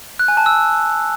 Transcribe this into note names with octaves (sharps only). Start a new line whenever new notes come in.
F#6
G#5
A5
E6